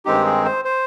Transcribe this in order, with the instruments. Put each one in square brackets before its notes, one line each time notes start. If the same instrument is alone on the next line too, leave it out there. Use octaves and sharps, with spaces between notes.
[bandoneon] G2 D#3 G#3 C4 D#4 G4
G#4
C5
C5